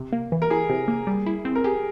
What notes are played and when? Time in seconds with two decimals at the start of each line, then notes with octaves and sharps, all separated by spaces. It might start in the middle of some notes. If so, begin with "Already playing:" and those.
Already playing: C3
0.13 A#3
0.32 E3
0.42 A#4
0.50 E4 G#4
0.70 C3
0.88 A#3
1.07 G3
1.26 E4
1.45 C4
1.55 A#4
1.64 G4 G#4